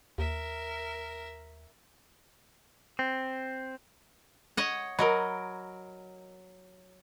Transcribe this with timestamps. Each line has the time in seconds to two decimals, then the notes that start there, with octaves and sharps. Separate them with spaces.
0.18 D#2 A#4 E5
2.99 C4
4.57 C#5 D#5 F#5
4.99 F#3 A#4 D#5 B5